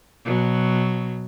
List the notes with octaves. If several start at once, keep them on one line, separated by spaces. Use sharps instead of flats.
B2 F#3